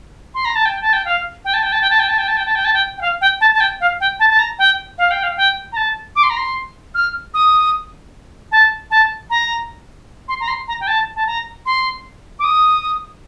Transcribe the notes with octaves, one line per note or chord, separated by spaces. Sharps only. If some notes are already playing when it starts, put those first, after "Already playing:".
C6
A#5
A5
G5
A5
G5
F5
G5
A5
G5
A5
G5
A5
G5
A5
G5
A5
G5
A5
G5
A5
G5
G5
F5
G5
A5
A5
G5
F5
G5
A5
A5
A#5
G5
F5
G5
F5
G5
A#5
A5
D6
C6
A#5
C6
F6
D#6
A5
A5
A#5
C6
A#5
C6
A#5
G5
A5
A5
A#5
C6
D6
D#6